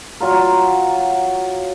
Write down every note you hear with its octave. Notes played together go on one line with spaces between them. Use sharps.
F#3 F4 A#4